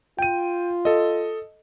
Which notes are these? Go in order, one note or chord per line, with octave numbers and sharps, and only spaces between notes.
F4 G5 D#7
A4 D#5